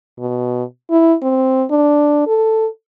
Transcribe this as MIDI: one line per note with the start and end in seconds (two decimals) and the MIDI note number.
0.19 0.63 47
0.91 1.15 64
1.22 1.64 60
1.71 2.23 62
2.27 2.67 69